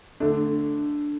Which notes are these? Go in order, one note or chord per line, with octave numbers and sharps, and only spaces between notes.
D3 A3 D4